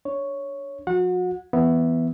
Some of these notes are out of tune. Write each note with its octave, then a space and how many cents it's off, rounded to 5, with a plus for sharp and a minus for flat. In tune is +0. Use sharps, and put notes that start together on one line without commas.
D4 +0 C#5 +0
F3 +40 F#4 -30 F#5 -30
E3 +0 B3 +0 E5 +0